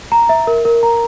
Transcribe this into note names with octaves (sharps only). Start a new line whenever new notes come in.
A#5
E5
A#4
A#4
A#5